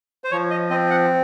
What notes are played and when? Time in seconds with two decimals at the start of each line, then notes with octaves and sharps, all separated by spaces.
0.24 C5
0.31 F3 C#5
0.51 D#5
0.70 C4 D#5
0.90 F#5